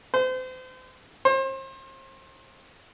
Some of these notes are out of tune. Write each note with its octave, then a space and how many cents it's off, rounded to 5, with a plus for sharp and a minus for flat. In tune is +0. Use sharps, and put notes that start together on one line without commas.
C5 -35
C5 +35